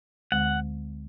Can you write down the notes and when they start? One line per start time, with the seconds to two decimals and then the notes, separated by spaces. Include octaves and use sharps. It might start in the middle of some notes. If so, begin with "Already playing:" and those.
0.32 D2 D3 G#3 F#5